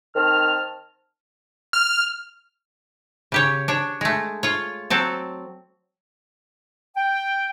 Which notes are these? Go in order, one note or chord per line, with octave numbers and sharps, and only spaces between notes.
D#3 C4 A5 F6
F6
C#3 G4 C#5
D4 C#5
G#3 A3
F4 C#5
F#3 C4 A4
G5